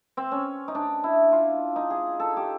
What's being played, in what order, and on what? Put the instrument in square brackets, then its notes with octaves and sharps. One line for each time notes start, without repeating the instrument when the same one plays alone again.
[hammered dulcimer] C4
C#4
D#4
D4
E4
F4
D#4
G#4
A4
G4